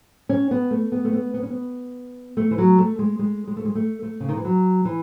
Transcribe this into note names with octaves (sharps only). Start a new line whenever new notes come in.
C#4
B3
A3
B3
A3
B3
B3
C#4
B3
A3
E3
F#3
A3
G#3
G#3
G#3
A3
G#3
A3
A3
C#3
D#3
E3
F#3
E3